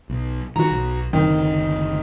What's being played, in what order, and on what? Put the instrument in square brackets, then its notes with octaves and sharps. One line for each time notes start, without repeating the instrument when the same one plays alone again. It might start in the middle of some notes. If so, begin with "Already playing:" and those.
[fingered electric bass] B1
[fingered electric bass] D#3 F3 [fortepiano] F#4 A#5
[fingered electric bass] B1
[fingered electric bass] F#1 D2 C4 [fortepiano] D#3